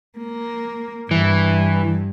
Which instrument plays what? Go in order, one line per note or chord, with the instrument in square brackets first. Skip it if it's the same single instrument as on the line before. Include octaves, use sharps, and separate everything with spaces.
[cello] A#3
[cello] G2 [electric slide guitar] E3